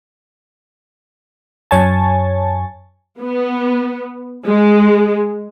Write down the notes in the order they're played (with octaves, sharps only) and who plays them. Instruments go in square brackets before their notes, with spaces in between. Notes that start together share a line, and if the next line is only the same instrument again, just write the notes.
[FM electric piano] F#2 C#5 G#5 A5
[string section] B3
G#3